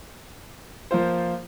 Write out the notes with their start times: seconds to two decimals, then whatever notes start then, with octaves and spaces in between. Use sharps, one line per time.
0.91 F3 A#3 F4 C5